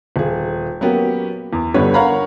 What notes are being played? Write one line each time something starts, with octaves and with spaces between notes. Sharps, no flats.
D#1 G#4
F#3 A#3 B3 C#4 G4
E2
G1 D3 G3 B3 B4 C#5
A#4 C#5 F5 F#5 A#5 B5